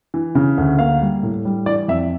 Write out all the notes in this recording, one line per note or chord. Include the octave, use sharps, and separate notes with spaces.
E3
C#3
D2
A#3 F5
G3
A2
G3
E3 D5
F2 E5